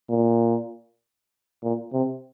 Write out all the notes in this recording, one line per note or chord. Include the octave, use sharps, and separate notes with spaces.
A#2
A#2
C3